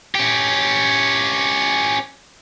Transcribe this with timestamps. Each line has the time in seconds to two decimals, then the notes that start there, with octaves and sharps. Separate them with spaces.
0.15 C#4 G4